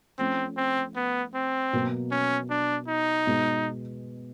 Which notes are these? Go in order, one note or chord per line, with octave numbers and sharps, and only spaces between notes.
F3 A3 C4 C#4
C4
B3
C4
B2 F#3 A#3
C#4
D4
D#4
B2 G#3 B3